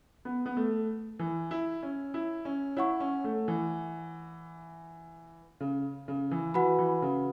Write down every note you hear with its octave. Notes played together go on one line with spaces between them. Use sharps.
B3
B3
A3
E3
E4
C#4
E4
C#4
E4 C#5 F#5 C#6
C#4
A3
E3
C#3
C#3
E3
E3 F#4 B4 F#5 B5
E3
C#3